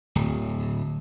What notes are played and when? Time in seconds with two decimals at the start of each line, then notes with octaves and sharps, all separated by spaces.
0.15 D1